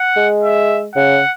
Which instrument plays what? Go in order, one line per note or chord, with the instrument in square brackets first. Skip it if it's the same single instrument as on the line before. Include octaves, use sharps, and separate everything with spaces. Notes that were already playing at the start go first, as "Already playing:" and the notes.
Already playing: [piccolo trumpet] F#5
[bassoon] G#3
[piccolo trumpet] E5
[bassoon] C#3 [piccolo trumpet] F#5